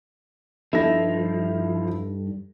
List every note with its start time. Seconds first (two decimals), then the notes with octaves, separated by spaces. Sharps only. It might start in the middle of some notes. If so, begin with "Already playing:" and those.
0.73 G2 F3 D#4 E4 A4 A#6